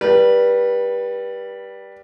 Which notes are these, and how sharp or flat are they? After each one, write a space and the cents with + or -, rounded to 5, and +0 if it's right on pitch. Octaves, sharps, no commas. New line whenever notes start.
G3 +0 B4 -30